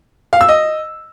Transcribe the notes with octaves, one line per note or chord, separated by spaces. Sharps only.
F5
E6
D#5